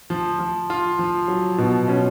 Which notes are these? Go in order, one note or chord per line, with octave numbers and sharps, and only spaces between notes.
F3
F3
F4
F3
F#3
B2
C#4